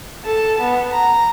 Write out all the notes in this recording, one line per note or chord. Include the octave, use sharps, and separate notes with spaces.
A4 A5
B3
A#5